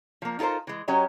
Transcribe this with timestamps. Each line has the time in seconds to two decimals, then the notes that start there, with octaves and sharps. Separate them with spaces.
0.22 F3 A#3
0.39 D#4 F4 A4 A#4 C5
0.67 E3 G#3
0.88 F#3 C#4 G4 D#5 A#5